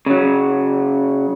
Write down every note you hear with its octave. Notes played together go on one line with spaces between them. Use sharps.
C#3 F#3